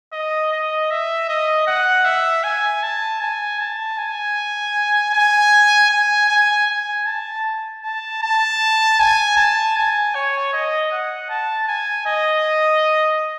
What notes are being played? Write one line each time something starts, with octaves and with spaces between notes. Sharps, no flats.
D#5
D#5
E5
D#5
F#5
E5
G#5
A5
G#5
A5
G#5
G#5
G#5
G#5
G#5
A5
A5
A5
G#5
A5
G#5
C#5
D#5
F#5
A5
G#5
D#5